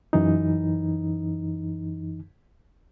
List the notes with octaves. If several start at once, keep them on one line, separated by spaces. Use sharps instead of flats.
F#2 E3 D#4